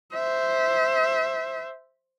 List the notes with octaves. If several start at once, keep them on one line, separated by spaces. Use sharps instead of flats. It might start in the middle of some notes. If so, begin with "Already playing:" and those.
C5 E5